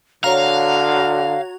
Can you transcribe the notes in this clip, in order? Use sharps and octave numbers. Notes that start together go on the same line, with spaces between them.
D3 F#4 C#5 F5 A#5